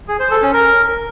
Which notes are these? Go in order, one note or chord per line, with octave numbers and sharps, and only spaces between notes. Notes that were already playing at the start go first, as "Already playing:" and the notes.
G#4
C5
A4
C#4
A#4